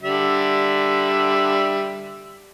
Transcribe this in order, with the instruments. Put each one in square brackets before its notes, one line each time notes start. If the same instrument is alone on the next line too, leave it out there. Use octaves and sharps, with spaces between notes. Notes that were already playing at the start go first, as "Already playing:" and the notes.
[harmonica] D3 G3 E5